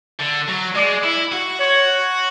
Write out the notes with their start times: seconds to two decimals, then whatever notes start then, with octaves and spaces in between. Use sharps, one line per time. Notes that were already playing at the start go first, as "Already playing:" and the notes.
0.19 D3
0.48 F#3
0.75 G#3 D5
1.04 E4
1.32 F#4
1.60 C#5